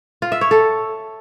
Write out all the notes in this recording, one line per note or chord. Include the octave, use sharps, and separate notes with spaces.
F4
E5
C#5
A4